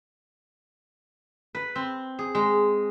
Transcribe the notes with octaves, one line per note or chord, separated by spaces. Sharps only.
B4
C4
G#4
G#3